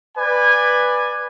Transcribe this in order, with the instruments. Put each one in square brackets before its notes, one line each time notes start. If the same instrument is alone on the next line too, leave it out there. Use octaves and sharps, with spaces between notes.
[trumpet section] B4 D5 G#5